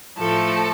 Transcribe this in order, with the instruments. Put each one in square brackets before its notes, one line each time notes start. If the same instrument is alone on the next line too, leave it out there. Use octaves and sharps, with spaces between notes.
[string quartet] A2 F3 A3 A4